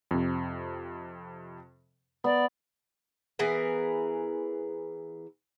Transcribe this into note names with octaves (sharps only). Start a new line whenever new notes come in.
F2 C3
B3 D5
E3 B3 G#4 A#4